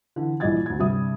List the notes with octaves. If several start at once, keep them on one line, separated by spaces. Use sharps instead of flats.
D3 E3
A#1 E3 G3 D#5 G#6 A6
D2 G#6
G2 C3 G3 E5 D#6